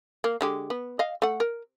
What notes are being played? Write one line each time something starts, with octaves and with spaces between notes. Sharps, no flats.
A#3
D3 G#3 G4
B3
D#5 F5
A3 F#5
A#4